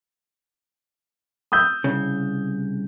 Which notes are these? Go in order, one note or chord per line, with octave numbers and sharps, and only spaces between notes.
D#6 E6 G6
C2 C#3